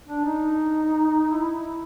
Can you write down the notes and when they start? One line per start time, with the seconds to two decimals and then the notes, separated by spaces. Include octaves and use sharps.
0.08 D4
0.25 D#4
1.33 E4